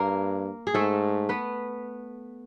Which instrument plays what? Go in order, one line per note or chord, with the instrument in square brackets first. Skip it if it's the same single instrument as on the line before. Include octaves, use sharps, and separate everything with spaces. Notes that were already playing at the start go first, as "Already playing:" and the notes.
Already playing: [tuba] G2 [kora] A#3 A#4
[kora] G#4
[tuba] G#2 [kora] A3 A4
[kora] B3 B4